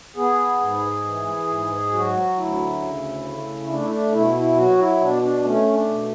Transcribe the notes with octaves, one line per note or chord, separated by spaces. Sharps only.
B3 G#4
G#2
E3
G#2
F#3 F#4
D2 E4
C#3
A3
A3 D4
E4
D4
B2 E4
E4
F#3 F#4
E4
B2 D4
D4
A3 C#4
D4
B2